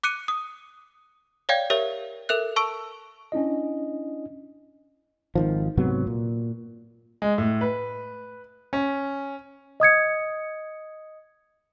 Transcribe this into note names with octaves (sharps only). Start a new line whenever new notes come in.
D6 F#6 C#7 D#7
D#6
C#5 D5 F5 G5 G#6
G4 A#4 C#5 E5
A4 A#4 E5 F#6
A5 C#6 E6 D7
C#4 D4 E4 D#5
G#1 D#3 F3
G#2 C3 F#3 B3
A#2
G#3
A2
B4
C#4
D#5 D#6 G#6 C#7